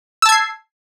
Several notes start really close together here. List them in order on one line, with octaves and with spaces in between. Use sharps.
E6 A5 G#6 C7